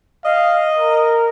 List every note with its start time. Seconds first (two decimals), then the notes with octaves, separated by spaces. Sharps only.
0.25 D#5 F5
0.78 A#4